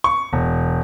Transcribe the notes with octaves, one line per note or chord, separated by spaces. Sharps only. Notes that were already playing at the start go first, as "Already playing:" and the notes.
C#6
E1